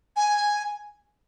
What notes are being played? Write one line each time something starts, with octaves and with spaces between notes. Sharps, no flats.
G#5